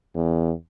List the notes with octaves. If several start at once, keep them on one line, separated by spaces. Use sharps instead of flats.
E2